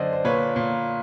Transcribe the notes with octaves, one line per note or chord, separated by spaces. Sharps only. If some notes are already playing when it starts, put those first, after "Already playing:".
Already playing: F#2 D3 C5 D5 D#5
C5
A#2 B4 C#5
A#2